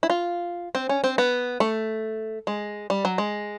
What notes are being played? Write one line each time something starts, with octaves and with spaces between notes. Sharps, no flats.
E4
F4
C4
C#4
C4
B3
A3
G#3
G3
F#3
G#3